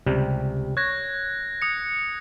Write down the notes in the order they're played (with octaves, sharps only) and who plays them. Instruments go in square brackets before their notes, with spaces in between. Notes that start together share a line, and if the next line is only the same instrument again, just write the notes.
[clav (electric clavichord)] C#2 C3 G3
[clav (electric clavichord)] C#5 [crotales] F#6 G#6 A#6
[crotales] D#6 C#7